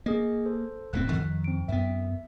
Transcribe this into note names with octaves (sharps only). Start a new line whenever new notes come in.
A#3 G#4 D#5
A4 C5
D1 A2 C4 F#6 B6
F2 D#3
C4 D7
F#2 B3 E5